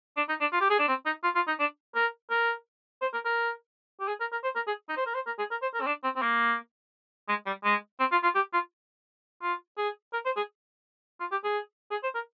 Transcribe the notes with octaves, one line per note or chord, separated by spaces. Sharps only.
D4
D#4
D4
F4
G4
G#4
D4
C4
D#4
F4
F4
D#4
D4
A#4
A#4
C5
A#4
A#4
G4
G#4
A#4
A#4
C5
A#4
G#4
D#4
C5
A#4
C5
A#4
G#4
A#4
C5
A#4
C4
D4
C4
C4
A#3
G#3
G3
G#3
C4
F4
F4
G4
F4
F4
G#4
A#4
C5
G#4
F4
G4
G#4
G#4
C5
A#4